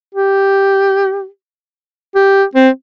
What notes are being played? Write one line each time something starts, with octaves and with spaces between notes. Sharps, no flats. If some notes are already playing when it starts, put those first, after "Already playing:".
G4
G4
C4